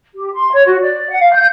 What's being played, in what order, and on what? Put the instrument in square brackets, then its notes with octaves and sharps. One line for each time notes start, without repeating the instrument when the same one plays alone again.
[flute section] G4
C6
C#5
F#4
D5
F#5
F5
G6